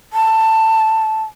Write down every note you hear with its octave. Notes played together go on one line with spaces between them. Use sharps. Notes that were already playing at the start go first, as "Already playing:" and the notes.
A5